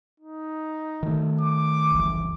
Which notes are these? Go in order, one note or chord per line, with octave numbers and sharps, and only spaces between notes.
D#4
D#3 A3
D6
F#1 C2 E3